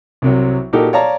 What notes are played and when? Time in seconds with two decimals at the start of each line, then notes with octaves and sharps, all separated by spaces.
0.22 C2 C3 F#3
0.73 A#2 D#4 F#4 G4 A4 A#4
0.93 C#5 D5 F5 A5 A#5